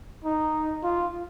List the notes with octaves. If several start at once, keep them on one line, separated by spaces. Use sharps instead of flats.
D#4
F4